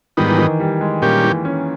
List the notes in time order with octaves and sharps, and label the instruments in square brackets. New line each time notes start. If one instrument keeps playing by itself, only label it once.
[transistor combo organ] G#2 G3 B3 D#4 [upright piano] D#3
[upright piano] E3
D#3
G3
G#3
[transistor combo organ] A#2 G3 C#4 G4 [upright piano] A#3
[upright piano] E3
C#4